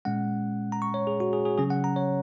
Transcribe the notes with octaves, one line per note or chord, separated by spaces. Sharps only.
A#2 G#3 C#4 F#5
A#5
C#6
C#5
G#4
F#4
G#4
G#4
C#3 F#3 C#4 G#4
F#5
A#5
C#5